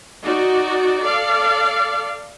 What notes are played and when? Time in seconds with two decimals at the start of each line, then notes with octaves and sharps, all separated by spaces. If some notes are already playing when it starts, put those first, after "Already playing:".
0.23 D#4 F#4 D5
1.03 A4 D5 F5